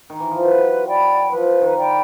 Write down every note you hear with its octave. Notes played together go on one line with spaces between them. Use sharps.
D#3
E3
F3
F#3 B4
D5 G5 B5
F3 B4
D#3
D5 G5 B5